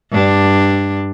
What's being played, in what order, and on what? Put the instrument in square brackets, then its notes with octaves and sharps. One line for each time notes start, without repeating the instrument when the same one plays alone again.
[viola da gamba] G2 D4